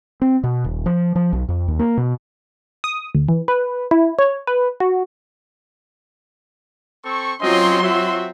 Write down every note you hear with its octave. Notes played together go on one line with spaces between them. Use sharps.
C4
B2
D#1
F3
F3
B1
F2
D#2
A#3
B2
D#6
D2
E3
B4
E4
C#5
B4
F#4
C4 A4 C#6
F#3 C4 C#4 F4 D#5 C6
C4 F#4 E5